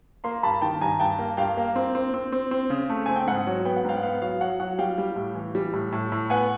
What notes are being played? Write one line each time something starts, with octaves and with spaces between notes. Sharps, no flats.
A#3 A#5 C6
G2 A5 B5
D#3 G5 A5
G2 G#5 A#5
G2 G5 A5
A#3
G2 F5 G5
A#3
C4
C4
C4
C4
C4
C#3
A3
C4 G#5
G5
G#2 F#5
F#3
B3 G5
F#5
G#2 F5 G5
F#5
B3 F5
F#3 F5
F#3 F#5
F#3 F#5
G3 F5 G5
G3
A2
E3
G3
A2
A2
A2
B3 F#5 G#5